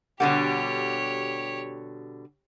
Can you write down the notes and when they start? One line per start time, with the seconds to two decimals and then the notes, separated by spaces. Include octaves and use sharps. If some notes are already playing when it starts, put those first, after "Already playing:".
0.20 B2 D3 G3 G4 C#5 F#5